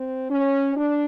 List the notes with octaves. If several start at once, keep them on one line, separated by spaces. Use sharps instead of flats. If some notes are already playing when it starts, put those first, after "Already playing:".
Already playing: C4
C#4
D4